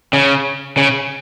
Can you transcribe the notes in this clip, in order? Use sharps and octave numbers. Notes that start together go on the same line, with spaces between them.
C#3
C#3